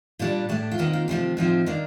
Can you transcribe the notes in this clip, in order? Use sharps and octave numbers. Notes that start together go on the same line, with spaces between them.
A#2 G3 D4 A4
A2 A3 D4
F4
C3 D#3 A#3 D#4
F4
C3 F3 A3 C4 G4
A2 F3 C4 D#4
D#3 A#3 D4